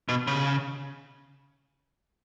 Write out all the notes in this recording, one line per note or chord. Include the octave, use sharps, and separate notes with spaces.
B2
C#3